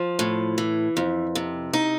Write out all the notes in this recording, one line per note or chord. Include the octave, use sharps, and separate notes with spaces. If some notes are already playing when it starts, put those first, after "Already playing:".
Already playing: F3
A2
E3
F2
C3
D#4